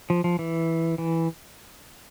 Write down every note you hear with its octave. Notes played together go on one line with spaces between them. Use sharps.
F3
F3
E3
E3